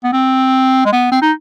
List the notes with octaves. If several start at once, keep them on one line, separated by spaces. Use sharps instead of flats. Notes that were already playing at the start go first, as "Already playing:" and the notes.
B3
C4
G#3
B3
C4
D#4